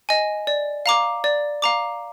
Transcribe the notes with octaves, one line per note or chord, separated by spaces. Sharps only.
D#5 G#5
D5
F5 A#5 D6
D5
F5 A#5 D6